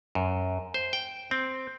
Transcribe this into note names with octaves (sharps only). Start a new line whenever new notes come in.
F#2
C5
G5
C4